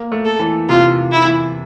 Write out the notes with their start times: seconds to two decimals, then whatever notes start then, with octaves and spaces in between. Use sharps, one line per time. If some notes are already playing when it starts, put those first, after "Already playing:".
Already playing: A#3
0.12 A3
0.25 A4
0.40 E3
0.69 C3 F4
1.11 E4
1.25 E3